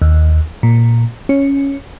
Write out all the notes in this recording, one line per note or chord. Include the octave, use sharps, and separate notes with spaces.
D#2
A#2
C#4